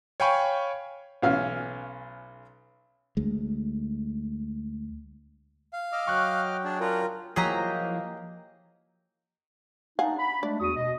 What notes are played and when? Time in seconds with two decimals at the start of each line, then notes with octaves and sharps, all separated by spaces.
0.20 C#5 F5 G5 G#5 B5 C#6
1.22 B1 E3 C#4 F5
3.17 D2 G#3
5.73 F5
5.92 D#5 D6 E6 F6
6.08 F#3 G5 C#6 F#6
6.64 D4 G#4 C#5 D5
6.80 C#4 D4 F4 A#4 F#5
7.36 F3 F#3 A#3 E4 G4 G#4 D#5 A#5
9.99 D4 D#4 F5 F#5 G#5
10.19 B5
10.43 G#3 A3 D4 D5
10.60 E2 F#4 D#6
10.76 B2 D#5